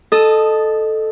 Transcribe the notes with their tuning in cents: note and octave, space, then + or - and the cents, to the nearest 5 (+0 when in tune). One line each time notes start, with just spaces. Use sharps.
A4 -5 D#5 -20 D#6 +0